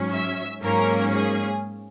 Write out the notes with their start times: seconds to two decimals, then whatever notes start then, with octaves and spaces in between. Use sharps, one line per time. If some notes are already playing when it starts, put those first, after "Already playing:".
Already playing: G#2 F#3 C#4
0.12 E5
0.62 G#2 F#3 A#3 C#4 A#4
1.13 G#4